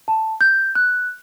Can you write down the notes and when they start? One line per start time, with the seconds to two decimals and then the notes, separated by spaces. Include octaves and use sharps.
0.08 A5
0.41 G6
0.75 F#6